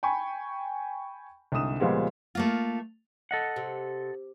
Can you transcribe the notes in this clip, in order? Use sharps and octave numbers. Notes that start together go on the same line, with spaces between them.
G5 G#5 B5 C#6
C2 G#2 D3 D#6 E7
C#2 A#2 F3 G3 G#3 B3
A3 A#3 F4
A4 D#5 F#5
C3